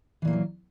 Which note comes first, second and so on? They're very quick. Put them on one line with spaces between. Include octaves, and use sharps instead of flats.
E3 A#2 A#3 A3 F#3